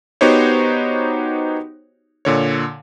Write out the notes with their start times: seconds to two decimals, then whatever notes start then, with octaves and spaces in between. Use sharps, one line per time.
0.21 B3 D#4 F#4 G4 C5 C#5
2.25 A#2 D3 C#5